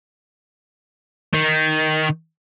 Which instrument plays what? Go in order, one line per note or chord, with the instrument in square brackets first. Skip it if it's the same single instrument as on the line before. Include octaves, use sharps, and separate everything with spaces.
[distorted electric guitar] D#3